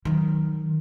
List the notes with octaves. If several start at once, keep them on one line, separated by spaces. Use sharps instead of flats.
D#3 F#3